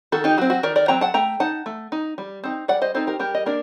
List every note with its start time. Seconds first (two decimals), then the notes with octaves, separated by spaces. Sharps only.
0.12 D#3 F#4 A4
0.24 D#4 G4
0.38 F#3 F#4
0.41 C4
0.50 F#4
0.63 D#3 A#4 D5
0.76 A#4 D5
0.88 F#3 C4 G5 A#5
1.01 F#5 A5
1.14 A3 G5 A#5
1.40 D#4 F#5 A5
1.66 A3
1.92 D#4
2.18 G3
2.44 C4 D#4
2.68 G3 D5 F#5
2.82 C5 D#5
2.94 C4 D#4 A4 C5
3.07 G4 A#4
3.19 G3 G4 A#4
3.35 D#5
3.46 A#3 D4 A#4 D5